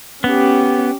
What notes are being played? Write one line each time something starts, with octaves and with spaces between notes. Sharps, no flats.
B3 C#4 G4